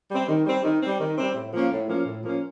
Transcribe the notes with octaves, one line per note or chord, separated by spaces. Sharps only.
G3 C4
D#3
G3 C4
D#3
G3 C4
D#3
G3 C4
A2
F3 A#3 C#4
A2
F3 A#3 C#4
A2
F3 A#3 C#4